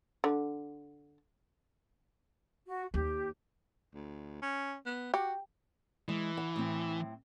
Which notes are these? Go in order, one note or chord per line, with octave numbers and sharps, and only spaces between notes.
D3
F#4
D#2 G4
D2
C#4
B3
F#4 G4
E3 G#3
F#5
A2 C4